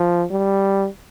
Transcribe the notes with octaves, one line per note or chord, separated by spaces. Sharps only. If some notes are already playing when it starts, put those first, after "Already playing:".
Already playing: F3
G3